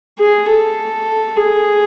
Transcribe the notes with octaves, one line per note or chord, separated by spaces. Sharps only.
G#4
A4
G#4